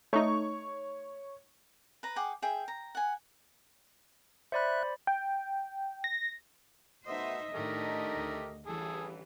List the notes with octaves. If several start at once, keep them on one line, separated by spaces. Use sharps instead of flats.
A3 D#4 C#5 C#6
B4 A#5
G#4 F#5 G5 D6
G#4 E5 G5
A#5
F#5 G#5
C5 D5 E5 B5 F#6
G5
A#6
A3 B3 D#4 F#4 C5 D#5 E5
A2 D#3 A3 D4 D#4 G4 A#4
D2
A1 D3 E3 G3 G#4 A4